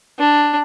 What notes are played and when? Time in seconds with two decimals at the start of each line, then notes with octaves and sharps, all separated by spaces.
0.19 D4